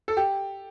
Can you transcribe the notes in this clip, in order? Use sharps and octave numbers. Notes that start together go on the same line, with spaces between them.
A4
G4